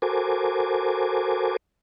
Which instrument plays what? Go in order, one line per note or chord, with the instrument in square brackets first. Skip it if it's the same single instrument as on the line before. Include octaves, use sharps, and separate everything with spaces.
[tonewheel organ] F#4 A4 A#4 C5 G#5 D6